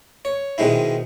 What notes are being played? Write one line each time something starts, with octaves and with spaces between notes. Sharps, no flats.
C#5
B2 D#3 G#3 C4 E4